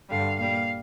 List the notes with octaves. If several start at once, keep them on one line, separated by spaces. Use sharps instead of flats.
G2 D3 G3 F5
A#2 G3 F5